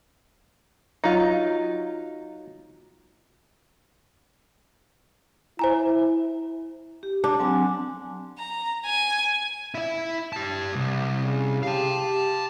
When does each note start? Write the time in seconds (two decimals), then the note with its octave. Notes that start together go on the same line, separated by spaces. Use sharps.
1.04 F#3 D#4 F4
5.59 E4 C5 G#5 A#5
7.03 G4
7.24 D4
7.40 F#3 C4 G#5
8.38 A#5
8.86 G#5
9.75 E4 E5
10.33 G4 A5
10.75 C2
11.21 C#3
11.63 G4 F5 A5